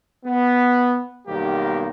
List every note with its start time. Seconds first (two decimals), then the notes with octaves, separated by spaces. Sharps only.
0.25 B3
1.27 B1 D#3 G3 A#3 B3 G4